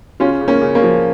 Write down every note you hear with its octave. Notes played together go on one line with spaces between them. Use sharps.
C#3 C#4 F4
C#3
A#3 C#4
C#3
A#3 C#4
F3